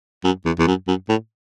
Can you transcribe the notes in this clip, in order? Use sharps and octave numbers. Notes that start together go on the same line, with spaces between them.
F#2
E2
E2
F#2
F#2
A2